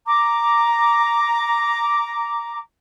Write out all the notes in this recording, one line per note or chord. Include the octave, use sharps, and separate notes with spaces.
A#5 D6